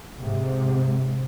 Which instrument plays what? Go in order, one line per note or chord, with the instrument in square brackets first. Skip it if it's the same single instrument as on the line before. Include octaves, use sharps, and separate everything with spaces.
[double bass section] G#2 C3